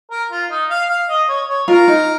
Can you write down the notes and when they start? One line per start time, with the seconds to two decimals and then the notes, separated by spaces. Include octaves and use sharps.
0.11 A#4
0.31 F4
0.51 D#4
0.70 F5
0.89 F5
1.09 D#5
1.29 C#5
1.49 C#5
1.68 F4 A#4
1.88 D#4